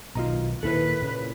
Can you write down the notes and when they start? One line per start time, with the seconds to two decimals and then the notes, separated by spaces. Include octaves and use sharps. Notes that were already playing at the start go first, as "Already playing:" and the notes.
0.15 B1 B2 D#3 F4 D#5 A#5
0.63 D#2 A#2 D#3 E4 A4 B4
1.02 A#2 C#3